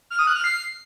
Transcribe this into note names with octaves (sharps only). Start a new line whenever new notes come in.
F6
D#6
F#6
F6
C7